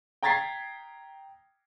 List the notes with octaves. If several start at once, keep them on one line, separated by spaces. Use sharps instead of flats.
G5 A#5 G#6 A6 B6 C7